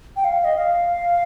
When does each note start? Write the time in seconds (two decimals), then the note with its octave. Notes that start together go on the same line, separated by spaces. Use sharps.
0.16 G5
0.24 F5
0.44 D#5
0.56 F5